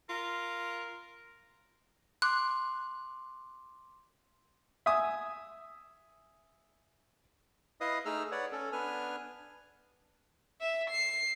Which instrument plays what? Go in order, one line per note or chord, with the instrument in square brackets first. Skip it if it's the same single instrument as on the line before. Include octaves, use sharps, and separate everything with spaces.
[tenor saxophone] F4 [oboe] A#4
[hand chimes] C6 D6 [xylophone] F#6
[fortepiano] E5 G#5 D#6
[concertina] E4 B4 D#5 F5 D#6
A3 D#4 G#4 E6 F6
B4 C#5 D5 F#5
C#4 A4
B3 D4 B4 G#5 F6
[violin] E5
C7